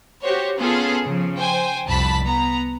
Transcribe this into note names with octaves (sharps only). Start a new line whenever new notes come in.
F#4 G4 C5 C#5
B3 C#4 F4 G#4 A4
C#3 F3
C5 G5 G#5
C2 F2 A5 B5 B6
B3 A#5